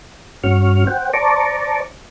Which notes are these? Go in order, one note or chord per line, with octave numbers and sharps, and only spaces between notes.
G2 C#4 F#4 C#6 F6
C5 F#5 G5
C5 D5 A5 A#5 C#6 D6